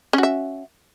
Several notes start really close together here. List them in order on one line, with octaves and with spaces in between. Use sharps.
C#4 F#4 E5